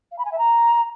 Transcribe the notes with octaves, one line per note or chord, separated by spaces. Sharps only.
F5
B5
G#5
E5
A#5